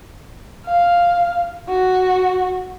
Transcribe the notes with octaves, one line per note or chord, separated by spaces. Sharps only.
F5
F#4